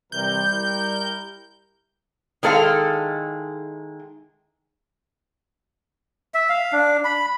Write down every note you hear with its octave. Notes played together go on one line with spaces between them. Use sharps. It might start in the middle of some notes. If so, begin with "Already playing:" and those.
C3 E3 G3 A#4 G6
E4 G4 A#4
D#3 G#3 E4 A4 B4 F5
E5
F5
D4
B5